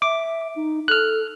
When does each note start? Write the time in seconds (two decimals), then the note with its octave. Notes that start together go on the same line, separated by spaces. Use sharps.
0.02 E5 D6
0.56 D#4
0.88 A4 F6 F#6